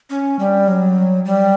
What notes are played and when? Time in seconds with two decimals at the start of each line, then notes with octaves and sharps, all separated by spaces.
0.10 C#4
0.39 G3
0.68 F#3
1.25 G3